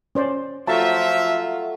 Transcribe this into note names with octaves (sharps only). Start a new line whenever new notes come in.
C#4 C5 D5
F3 F#3 A3 F4 E5 F#5 A5